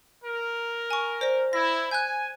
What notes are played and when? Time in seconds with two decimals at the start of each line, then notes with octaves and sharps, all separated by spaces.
0.24 A#4
0.91 G#5 C#6
1.21 C5 D5 A#6
1.53 E4 A#6
1.91 G#5 F#6 G6